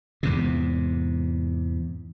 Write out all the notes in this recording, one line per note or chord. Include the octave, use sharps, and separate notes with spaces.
E2 G#2 C3